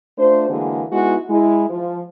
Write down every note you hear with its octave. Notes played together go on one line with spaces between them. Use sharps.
A3 D4 F4 C5
D3 E3 G#3 A#3 F#4 G#4
G#3 B3 D#4 E4 F#4
G#3 E4
F3